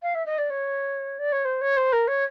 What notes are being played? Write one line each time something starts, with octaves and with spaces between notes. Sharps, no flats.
F5
E5
D#5
D5
C#5
D5
C#5
C5
C#5
C5
A#4
C#5